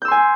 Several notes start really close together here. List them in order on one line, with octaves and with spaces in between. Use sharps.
G6 E6 C6 G#5